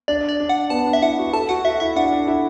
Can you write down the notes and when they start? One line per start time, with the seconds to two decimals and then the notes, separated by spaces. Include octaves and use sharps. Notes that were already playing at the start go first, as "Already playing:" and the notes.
0.08 D4 D5
0.29 D5
0.40 D4
0.49 F#5
0.70 B3 A5
0.86 D4
0.93 E5
1.02 E4 F#5
1.18 F#4
1.33 A4 A5
1.49 F#4 F#5
1.65 F#4 E5
1.80 E4 E5
1.96 D4 F#5
2.12 D4
2.27 E4